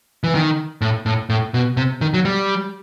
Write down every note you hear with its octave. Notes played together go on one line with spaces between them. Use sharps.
E3
D#3
A2
A2
A2
B2
C3
D#3
F#3
G3